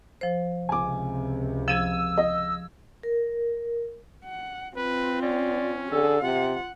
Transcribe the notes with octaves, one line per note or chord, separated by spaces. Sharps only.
F3 C5
C#2 C3 G#5 D6
F3 E6 G#6 D#7 E7
D#5
A#4
F#5
C4 F4 B4
C#4 D5
D3 G#4 A4
C3 F4 F#5